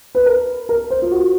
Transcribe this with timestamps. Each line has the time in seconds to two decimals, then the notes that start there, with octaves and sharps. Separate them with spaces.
0.15 B4
0.26 A#4
0.69 A#4
0.90 C5
1.02 F4
1.11 F#4